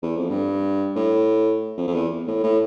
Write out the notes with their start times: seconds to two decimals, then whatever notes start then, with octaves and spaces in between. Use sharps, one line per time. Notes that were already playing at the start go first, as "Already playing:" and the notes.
0.03 E2
0.17 F2
0.30 G2
0.96 A2
1.77 F2
1.88 F2
1.94 E2
2.27 A2
2.44 A2